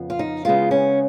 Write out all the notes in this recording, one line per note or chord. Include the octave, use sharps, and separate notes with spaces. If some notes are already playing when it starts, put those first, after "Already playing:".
Already playing: F2 C#3 F3 B3
F4
D#4
C#3 G#3 B3 F4
C#4